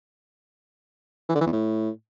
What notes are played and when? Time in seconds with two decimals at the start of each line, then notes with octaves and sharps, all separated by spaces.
1.29 E3
1.35 D3
1.40 E3
1.46 E2
1.52 A2